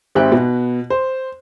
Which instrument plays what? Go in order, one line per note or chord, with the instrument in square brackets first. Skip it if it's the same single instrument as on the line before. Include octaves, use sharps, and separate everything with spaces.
[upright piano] G#1 C4 G4 E5 G5 F#6
B2
C5